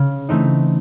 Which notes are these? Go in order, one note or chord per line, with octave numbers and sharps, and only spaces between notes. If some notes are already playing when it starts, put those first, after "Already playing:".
Already playing: C#3
E3 A3 C4 D#4